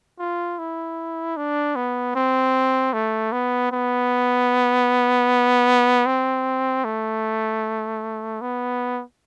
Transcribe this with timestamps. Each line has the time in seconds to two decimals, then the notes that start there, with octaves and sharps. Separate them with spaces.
0.19 F4
0.59 E4
1.37 D4
1.76 B3
2.16 C4
2.93 A3
3.32 B3
3.72 B3
6.06 C4
6.85 A3
8.41 B3